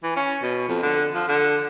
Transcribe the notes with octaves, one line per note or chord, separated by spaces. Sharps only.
E3
C#4
B2
F2
D3
F3
D3